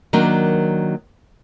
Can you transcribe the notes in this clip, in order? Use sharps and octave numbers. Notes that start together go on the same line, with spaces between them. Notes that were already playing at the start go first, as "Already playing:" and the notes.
D#3 F#3 A#3 D4